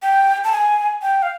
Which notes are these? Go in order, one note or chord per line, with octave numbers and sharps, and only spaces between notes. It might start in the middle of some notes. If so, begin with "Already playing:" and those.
G5
A5
G#5
G5
F5